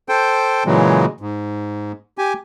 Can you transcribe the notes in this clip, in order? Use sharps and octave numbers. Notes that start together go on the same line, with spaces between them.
A4 C5 G5
A#2 C#3 E3 F#3 G#3
G#2
G4 G#5